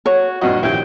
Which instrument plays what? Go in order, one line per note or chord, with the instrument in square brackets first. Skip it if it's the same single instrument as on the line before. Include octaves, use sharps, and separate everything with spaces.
[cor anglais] F#4 [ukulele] C#5
[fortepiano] A1 G2 A#2 [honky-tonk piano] F#4 [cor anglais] D#5
[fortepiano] A#1 D#2 A#2 [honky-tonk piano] E4 G4 [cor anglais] G5